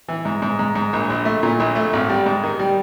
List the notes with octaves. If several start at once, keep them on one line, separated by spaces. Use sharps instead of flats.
E3
G#2
G#2
G#2
G#2
A#1
A#1
A3
A#2
A#1
A3
G#1
G3
G#2
D#3
G3